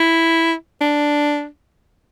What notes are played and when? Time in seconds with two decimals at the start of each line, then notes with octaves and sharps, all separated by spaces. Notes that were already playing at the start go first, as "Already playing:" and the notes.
Already playing: E4
0.81 D4